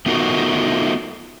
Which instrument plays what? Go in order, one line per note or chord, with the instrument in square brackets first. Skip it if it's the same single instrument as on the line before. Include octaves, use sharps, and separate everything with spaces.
[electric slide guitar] A3 B3 D#4 F4 F#4 A#4